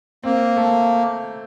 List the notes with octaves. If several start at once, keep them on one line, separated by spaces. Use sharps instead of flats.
A#3 C4
A3